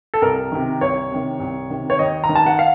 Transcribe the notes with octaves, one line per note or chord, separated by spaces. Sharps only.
A4
C2 A#4
C3 D#3
C2 C#5
C3 D#3
C2
C3 D#3
C#5
D#2 D#5
A#5
D#3
A5
F#5
F5